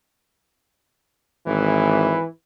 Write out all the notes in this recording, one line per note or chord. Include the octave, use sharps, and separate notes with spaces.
G#1 E3